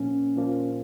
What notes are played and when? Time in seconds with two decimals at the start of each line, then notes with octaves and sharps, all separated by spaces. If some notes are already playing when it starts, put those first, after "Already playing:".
Already playing: A#2 F3 A#3 C#4
0.36 A#2 F3 A#3